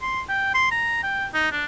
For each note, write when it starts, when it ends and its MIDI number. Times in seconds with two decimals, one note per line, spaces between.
0.02 0.21 84
0.29 0.50 79
0.54 0.68 84
0.72 1.03 82
1.03 1.26 79
1.34 1.49 63
1.52 1.66 62